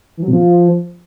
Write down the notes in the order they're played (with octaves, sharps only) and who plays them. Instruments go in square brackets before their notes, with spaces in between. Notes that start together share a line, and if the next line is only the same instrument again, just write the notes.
[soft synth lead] E3
F#3
B2
F3